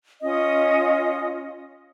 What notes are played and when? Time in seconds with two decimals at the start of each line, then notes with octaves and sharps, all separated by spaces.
0.22 C#4 F4 D#5 D#6